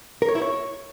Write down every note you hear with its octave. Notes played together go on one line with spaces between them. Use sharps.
A#4
C#5
E4
C#5